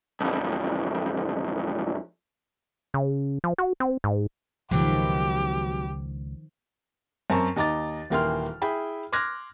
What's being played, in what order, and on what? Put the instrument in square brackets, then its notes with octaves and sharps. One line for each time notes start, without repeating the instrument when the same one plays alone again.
[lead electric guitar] B1 F2
[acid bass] C#3
F3
F#4
C4
G#2
[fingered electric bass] C#2 [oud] B2 F#3 [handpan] D#3 F3 [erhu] G4
[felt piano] F#2 C4 A#4 A5 A#5 C#6
D#2 D#5 A#5 D6 A6
D#1 E3 A#3 G5 C6 F6
E4 G#4 G5 B5
C6 D6 F6 F#6 G#6 A#6